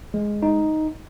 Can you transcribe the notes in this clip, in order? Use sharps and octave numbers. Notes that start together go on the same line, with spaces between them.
G#3
D#4